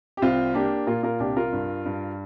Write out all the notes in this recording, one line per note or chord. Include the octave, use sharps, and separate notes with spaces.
G4
C2 C4 F4
A#3 D4 G4
A#2 F4 A#4
F4 A#4
C2 D4 G4
F4 A#4
G2
G2